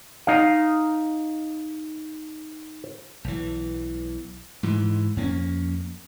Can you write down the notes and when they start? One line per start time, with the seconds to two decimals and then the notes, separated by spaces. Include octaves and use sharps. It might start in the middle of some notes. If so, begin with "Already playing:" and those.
0.27 D#4 F5
3.24 B1 E3
4.63 G#2 E3
5.17 F2 A#3 C4 C#4